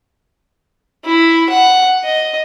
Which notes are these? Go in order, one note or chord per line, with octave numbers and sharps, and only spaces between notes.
E4
F#5
D#5